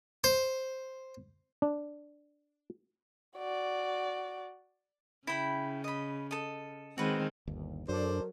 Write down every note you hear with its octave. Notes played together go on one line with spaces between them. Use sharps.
C5
D4
F#4 D5
C#3 E4 G5 B5
D#5 B5
A4 D#5
D#3 G#3 C4 F#4 B4
G1 D#2
F#2 F#3 D4 A4 A#4 C5 D5